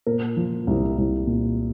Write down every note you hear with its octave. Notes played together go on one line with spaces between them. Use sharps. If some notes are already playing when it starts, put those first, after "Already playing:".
A#2 A#4
F3
C2
C2
A#2